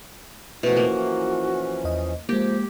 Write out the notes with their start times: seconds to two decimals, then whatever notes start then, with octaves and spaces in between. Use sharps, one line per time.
0.63 B2 E3 F3 A3 C#4 E4 F#4
0.77 A#3
1.84 E2 D#5
2.29 F3 G#3 A#3 G4